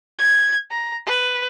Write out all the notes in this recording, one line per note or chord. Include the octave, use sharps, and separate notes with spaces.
G#6
A#5
B4